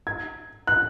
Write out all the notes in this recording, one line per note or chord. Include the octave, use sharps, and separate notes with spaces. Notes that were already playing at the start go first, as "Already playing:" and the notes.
G#6
F#6